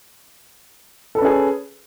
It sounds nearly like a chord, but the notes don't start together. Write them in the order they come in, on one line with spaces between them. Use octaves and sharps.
A4 B4 C#4 G#4